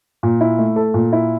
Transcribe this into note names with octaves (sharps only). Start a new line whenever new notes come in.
A#2
E4
A3
A4
A#2
E4